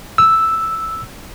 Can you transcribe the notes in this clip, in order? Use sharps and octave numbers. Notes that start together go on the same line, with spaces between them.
E6